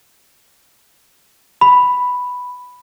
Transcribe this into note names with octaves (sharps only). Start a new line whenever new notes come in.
B5